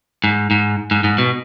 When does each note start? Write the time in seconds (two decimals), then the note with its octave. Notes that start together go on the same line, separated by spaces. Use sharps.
0.24 G#2
0.51 G#2
0.91 G#2
1.04 G#2
1.18 B2